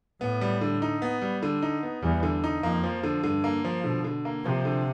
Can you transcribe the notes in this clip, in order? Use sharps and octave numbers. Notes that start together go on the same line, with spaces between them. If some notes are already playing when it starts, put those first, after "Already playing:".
A2 B3
G3
D3
D#4
B3
G3
D3
D#4
B3
E2 G3
D3
D#4
F2 A#3
F3
D3
G2 D3
A#3
F3
B2 D3
D3
A#3
C3 F3
D3